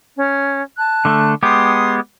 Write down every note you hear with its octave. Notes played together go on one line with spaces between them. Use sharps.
C#4
A5 F#6
D3 A3
G#3 B3 G4 C6 D#6